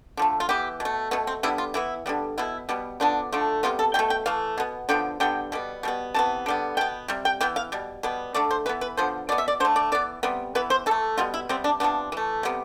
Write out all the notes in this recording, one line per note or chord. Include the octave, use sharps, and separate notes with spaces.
D3 F3 A3
F4
E3 B3 G4
B2
A3
B2 A3 B3
C4
D3 G3 B3 E4
F4
E3 B3 E4
D3 G3 B3
B2 B3 E4
B2 G3 B3
D3 F3 B3 D4
D3 F3 A3
C3 G3 B3 F4
A4
B2 A3 G5
G5
E3 A3 F5
B2 B3
D3 F3 B3 G5
D3 G3 B3 G5
B2 G3 B3
B2 G3 B3
C3 E3 B3 A5
D3 G3 B3
B2 B3 G5
C3 G3
G5
E3 B3 G5
F5
B2 G3
B2 G3 B3
D3 A3 D5
C5
E3 B3 B4
B4
D3 F3 B3 C5
B2 B3 D5
E5
D5
D3 A3 C5
D5
E3 B3 D5
C3 G3 B3
E3 B3 B4
C5
E3 A4
A3
B2 G3 B3 F4
E4
C3 G3 B3 C4
D4
C3 F3 B3 D4
E3 A3
C3 G3 B3